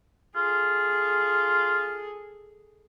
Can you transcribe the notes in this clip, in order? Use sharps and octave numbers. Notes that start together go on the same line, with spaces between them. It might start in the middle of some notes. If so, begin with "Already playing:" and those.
F4 G#4 A4